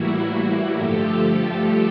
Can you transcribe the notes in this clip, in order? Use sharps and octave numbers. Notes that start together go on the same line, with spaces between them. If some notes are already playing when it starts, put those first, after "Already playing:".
Already playing: A2 E3 G3 A#3 E4 F#4
G2 D3 F3 A3 G4 A4
G4